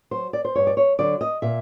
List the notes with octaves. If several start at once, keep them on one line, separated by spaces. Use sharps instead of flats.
F#3 C5
D5
C5
G2 C#5
D5
C#5
D3 F#3 D5
D#5
A#2 E5